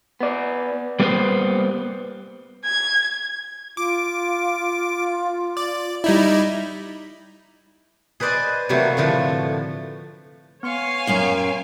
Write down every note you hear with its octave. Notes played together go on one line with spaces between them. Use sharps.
B3 D5
G3 A#3 B3 E4 B4 C5
G#6
F4 D6
D5
G3 D#4 E4
G#4 B4 C5 D5 D#5 G#5
C3 E3 F#3 A3 A#3
A2 D3 F3 A3
B3 C#5 F5 G#5 C6 C#7
F#2 C#4 A#4